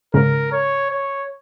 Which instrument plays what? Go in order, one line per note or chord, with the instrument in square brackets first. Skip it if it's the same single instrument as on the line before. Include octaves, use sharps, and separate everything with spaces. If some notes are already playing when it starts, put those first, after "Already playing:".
[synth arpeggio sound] G#2 C#3 [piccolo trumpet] A#4
[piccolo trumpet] C#5
C#5